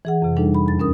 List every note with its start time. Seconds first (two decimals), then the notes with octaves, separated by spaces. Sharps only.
0.05 E3 G#4 F#5
0.22 F2 C3
0.37 G3 D4 D#4 A4
0.54 B5
0.66 E2 A6
0.79 D#2 C#4 A#4 D#6